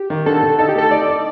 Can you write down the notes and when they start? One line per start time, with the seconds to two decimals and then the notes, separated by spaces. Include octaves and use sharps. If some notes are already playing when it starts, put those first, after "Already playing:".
Already playing: G4
0.10 D#3
0.26 D3 A4
0.43 D3
0.59 D#4 A4
0.69 G4
0.75 A3 A4
0.91 D#4 D5
1.08 D#4